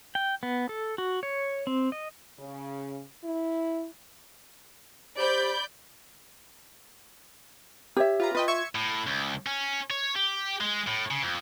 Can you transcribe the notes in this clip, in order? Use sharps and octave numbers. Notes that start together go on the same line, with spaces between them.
G5
B3
A4
F#4
C#5
C4
D#5
C#3
E4
G4 C5 D5 B5 G6
G4 C#5 E5
F4 B4 A#5
F4 B4 D#5 G5
E5 C#6 G#6
A2
C#2
C#4
C#5
G4
G#3
A2
C#3
F2